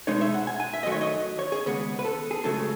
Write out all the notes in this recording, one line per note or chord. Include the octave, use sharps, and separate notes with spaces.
B2 G#3 D#4 C#5
E5
F#5
G#5
G#5
E5
F#2 D#3 F#3 A3 D#5
C#5
D#5
C#5
G#4
D#2 C#3 G#3 B3
B4
A4
G#4
C#2 C#3 F#3 A3 A4